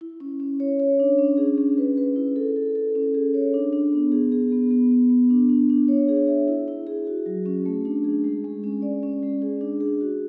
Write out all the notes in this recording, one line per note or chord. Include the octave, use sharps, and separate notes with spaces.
E4
C#4
C#4
C#5
C#5
D4
C#4
G#4
C#4
B4
B4
E4
A4
A4
A4
C#4
G#4
C#5
D4
D4
B3
G#4
G#4
B3
B3
B3
B3
D4
D4
D4
C#5
G#4
E5
E4
E4
G#4
F#4
F#3
C#4
A3
D4
G#4
G#3
G#3
C#4
D5
C#4
G#3
G#4
D4
G#4
F#4